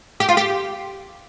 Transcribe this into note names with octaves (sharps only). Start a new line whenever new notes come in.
G4
F4
G4